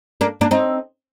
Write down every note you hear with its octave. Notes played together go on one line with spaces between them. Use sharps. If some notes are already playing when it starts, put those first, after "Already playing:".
A#3 D4
A#3 D4
C4 D#4